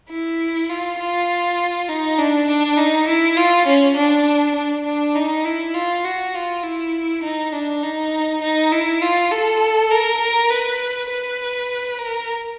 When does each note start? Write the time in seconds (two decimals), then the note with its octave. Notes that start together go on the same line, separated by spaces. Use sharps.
0.10 E4
0.69 F4
0.99 F4
1.89 D#4
2.18 D4
2.47 D4
2.77 D#4
3.08 E4
3.37 F4
3.67 C#4
3.96 D4
4.55 D4
4.86 D4
5.15 D#4
5.45 E4
5.74 F4
6.04 F#4
6.35 F4
6.63 E4
7.23 D#4
7.53 D4
7.83 D#4
8.42 D#4
8.72 E4
9.02 F4
9.31 A4
9.90 A#4
10.21 A#4
10.50 B4
11.10 B4
11.99 A#4